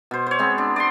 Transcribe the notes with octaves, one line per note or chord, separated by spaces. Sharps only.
B2 C5
C5 C#5
G#3 B3 C4
D4
D5 F#5 C6